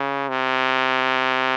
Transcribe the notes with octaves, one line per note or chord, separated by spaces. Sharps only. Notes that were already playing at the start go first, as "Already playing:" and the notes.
Already playing: C#3
C3